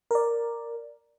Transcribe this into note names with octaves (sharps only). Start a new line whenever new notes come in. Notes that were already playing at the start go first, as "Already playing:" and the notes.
A#4 D5